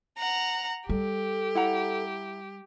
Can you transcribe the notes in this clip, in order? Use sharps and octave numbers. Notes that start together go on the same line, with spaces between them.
F#5 A#5
G3 G4 A4
E4 F#5 A#5